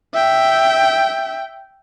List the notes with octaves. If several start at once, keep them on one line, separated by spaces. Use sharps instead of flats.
E5 G5